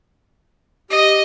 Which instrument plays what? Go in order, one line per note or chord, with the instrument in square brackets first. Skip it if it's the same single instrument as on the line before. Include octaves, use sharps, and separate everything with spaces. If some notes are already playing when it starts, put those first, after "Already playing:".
[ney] G4 [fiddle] D#5